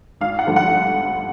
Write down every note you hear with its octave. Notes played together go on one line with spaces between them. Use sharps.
G#1 F5
F#5
G2 D3 F3 A3
F#5